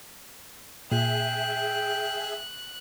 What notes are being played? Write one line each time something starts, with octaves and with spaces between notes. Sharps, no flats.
A#2 G#4 E5 G5 F#6